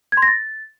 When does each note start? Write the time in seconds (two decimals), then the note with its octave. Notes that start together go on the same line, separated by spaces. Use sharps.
0.12 G#6
0.17 C6
0.22 A#6
0.27 A6